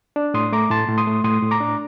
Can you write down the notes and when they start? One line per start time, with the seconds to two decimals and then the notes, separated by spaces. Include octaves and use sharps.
0.16 D4
0.34 A2 C6 D#6
0.52 A3 A#5 D6
0.70 A2 A5 C6
0.88 A2
0.98 C6 D#6
1.07 A3
1.24 A2 C6 D#6
1.42 A2
1.51 A#5 D6
1.61 D4